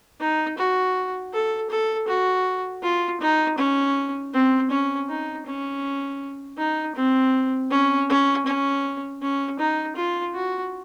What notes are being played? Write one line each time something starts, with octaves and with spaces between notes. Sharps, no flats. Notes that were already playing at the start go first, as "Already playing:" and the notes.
D#4
F#4
A4
A4
F#4
F4
D#4
C#4
C4
C#4
D#4
C#4
D#4
C4
C#4
C#4
C#4
C#4
D#4
F4
F#4